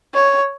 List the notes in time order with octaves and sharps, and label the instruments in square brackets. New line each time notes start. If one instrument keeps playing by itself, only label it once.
[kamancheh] C#5